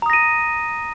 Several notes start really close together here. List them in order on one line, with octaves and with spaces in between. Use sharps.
A#5 D#6 A#6 D#7